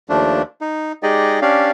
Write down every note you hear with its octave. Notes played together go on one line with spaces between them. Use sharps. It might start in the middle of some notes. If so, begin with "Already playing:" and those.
D#2 F3 A3 D4
D#4
G#3 D#4 G4 G#4 D5 D#5
C#4 D4 G4 D5 F5